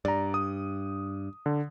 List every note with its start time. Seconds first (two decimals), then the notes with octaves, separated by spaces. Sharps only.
0.05 G2 D5 A#5
0.34 D#6
1.46 D3